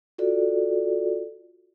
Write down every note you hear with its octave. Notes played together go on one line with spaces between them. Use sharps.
F4 F#4 A4 D5